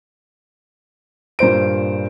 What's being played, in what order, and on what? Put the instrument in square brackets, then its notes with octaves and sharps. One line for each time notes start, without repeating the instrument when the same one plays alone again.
[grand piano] G2 A#2 C5 D7